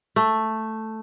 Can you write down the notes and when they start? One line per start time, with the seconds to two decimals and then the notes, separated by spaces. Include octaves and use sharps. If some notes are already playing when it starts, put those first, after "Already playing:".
0.16 A3